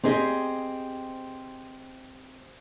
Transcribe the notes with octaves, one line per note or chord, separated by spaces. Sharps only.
C4 G4 G#4 D#5